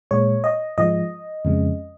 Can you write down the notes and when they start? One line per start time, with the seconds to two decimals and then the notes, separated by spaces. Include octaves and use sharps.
0.11 A#2 G#3 C#5
0.44 D#5
0.78 G#2 F3 G#3 D#5
1.45 F2 C#3 G#3